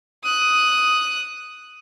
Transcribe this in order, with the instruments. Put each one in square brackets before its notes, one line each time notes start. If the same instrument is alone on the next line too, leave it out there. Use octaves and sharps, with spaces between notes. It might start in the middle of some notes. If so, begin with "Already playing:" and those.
[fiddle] D#6 F#6